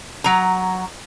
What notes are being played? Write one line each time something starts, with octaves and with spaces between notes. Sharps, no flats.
F#3 A#5